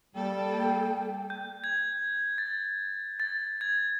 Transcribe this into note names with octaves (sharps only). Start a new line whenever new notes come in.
G3 A#3 A4 G5
G6
G#6
A6
A6
G#6